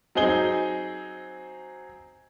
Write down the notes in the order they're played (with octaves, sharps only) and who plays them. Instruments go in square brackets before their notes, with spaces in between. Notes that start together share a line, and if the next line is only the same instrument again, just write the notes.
[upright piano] F#3 C4 D#4 G#4 G7